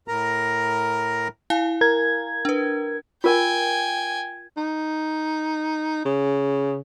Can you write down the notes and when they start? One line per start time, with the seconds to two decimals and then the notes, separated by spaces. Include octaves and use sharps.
0.08 A2 A#4 A#5
1.50 E4 F5 G#5
1.81 A#4 G#6
2.45 D4 B4
3.24 F4 A#4 G5 G#5
4.57 D#4
6.05 C#3